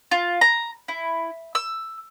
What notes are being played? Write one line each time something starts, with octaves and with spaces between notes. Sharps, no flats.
F4
A#5
E4
E6